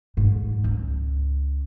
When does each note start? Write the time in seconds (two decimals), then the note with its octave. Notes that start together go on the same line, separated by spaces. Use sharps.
0.17 G#2
0.64 C#2